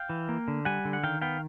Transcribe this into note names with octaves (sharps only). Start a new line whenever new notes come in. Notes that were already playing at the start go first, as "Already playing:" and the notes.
Already playing: F5 G5
E3
A#3
D3
G3 F#5 G#5
D3
F#5
D#3 F5 G5
B3 F5 G5